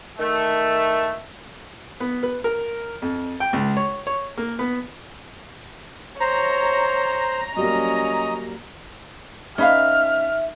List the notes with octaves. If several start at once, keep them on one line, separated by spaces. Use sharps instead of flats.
D#3 A3
B3
B4
A#4
F2
G5
C#2
C#5
C#5
A#3
B3
C5 C#5 A#5
F#3 G3 A#3 C#4 D#5
C#4 D#4 B4 E5 F5 F6